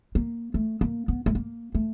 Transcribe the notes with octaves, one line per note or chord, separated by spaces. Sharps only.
A#3
A3
A#3
B3
A3
A#3
A3